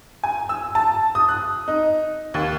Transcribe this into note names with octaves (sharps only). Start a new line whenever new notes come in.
G#5
E6
A5
D#6
F#6
D#4
D#2